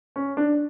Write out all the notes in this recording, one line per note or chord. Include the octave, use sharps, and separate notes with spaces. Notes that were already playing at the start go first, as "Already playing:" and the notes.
C#4
D4